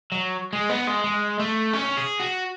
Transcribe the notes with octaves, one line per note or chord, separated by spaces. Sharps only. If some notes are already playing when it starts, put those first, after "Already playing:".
F#3
G#3
B3
G#3
G#3
A3
C#4
G#4
F#4